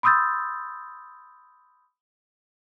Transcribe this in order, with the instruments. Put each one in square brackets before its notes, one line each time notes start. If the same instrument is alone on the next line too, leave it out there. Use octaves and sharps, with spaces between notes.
[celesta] B5 C6 D#6 E6 G6 A6